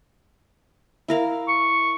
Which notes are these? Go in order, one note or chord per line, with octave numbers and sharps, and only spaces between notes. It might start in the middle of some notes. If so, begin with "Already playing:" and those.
E4 A#4 F5
C#6